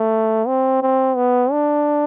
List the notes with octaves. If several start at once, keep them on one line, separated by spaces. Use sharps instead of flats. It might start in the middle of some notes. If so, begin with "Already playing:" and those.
Already playing: A3
C4
C4
B3
D4